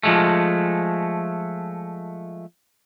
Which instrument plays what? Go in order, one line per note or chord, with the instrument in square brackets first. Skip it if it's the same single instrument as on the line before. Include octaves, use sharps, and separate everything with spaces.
[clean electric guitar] F3 G#3 A3